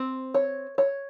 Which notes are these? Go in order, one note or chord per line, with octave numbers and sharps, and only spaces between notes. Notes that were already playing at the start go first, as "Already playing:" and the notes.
Already playing: C4
C#5
C#5